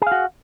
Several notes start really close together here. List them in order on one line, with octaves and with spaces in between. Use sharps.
G#4 F5 F#4